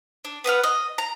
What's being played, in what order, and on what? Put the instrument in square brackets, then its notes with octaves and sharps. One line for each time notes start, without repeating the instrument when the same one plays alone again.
[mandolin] D4
B3 B4 F#5 F6
D#5
A#5